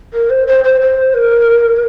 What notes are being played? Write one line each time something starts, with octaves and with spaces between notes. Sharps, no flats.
A#4
C5
C5
C5
C5
A#4